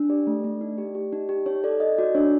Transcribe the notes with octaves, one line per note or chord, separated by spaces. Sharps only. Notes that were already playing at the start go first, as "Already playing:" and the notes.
Already playing: D4
G4 D5
A3
A3
D#4
G4
G4
D#4
G4
D#4 C#5
A4 D5
D#4 D#5
F#4 D5
D4 C#5